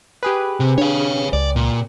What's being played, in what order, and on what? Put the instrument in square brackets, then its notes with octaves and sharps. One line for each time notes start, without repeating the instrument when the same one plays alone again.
[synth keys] G4 G#4 B4
[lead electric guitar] C3
[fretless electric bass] D4 [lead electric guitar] C#5 F5
[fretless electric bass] C#2 [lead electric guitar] D5
[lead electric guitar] A#2